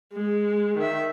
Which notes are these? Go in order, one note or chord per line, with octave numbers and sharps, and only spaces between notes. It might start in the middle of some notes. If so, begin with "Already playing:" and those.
G#3
D#3 E5